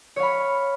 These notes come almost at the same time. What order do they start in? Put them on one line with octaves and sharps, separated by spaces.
C#5 F5 B5